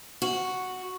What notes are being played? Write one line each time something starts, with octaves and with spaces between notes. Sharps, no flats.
F#4